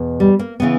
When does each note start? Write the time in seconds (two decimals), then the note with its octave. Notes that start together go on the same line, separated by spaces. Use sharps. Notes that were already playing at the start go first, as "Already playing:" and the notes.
Already playing: E2 B2
0.20 G3
0.39 A#3
0.60 C#3 E3 B3